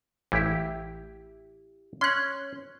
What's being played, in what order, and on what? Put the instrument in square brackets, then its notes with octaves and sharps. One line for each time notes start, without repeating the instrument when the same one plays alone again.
[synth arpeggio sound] A1 [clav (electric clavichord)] E4 G4
[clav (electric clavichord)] C#4 [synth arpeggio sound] C6 F#6